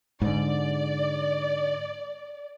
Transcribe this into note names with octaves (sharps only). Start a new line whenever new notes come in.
G#2 D3 D5